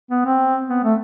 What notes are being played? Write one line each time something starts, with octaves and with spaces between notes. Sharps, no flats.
B3
C4
B3
A3